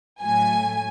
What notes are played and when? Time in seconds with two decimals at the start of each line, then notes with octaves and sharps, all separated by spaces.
0.21 A2 F#3 A3 G#5